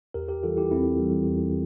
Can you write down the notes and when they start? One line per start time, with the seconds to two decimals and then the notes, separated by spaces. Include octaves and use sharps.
0.14 E2 G4 A#4
0.29 G4 A#4
0.43 E3 G3 F4 A4
0.57 E4 G4
0.71 E2 C4 E4
1.00 E3 G3
1.28 E2